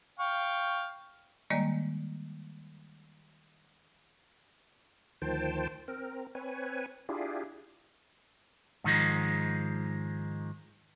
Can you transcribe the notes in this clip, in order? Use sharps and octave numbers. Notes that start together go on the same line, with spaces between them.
F5 G5 C#6
D#3 G3 G#3 A#3 D5 D#5
D2 D#3 F3 C5 G5 A5
C4 A#4
C4 B4 C#5 G#5
D4 E4 F4 G4 G#4
G#2 D#3 F3 G#3